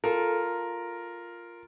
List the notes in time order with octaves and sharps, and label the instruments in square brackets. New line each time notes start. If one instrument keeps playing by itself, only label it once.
[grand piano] F4 A#4 [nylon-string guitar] A4